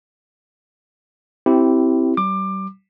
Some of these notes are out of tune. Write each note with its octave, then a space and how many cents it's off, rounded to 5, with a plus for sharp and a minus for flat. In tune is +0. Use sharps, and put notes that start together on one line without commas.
C4 +0 E4 +0 G4 -15
G3 -40 D6 +20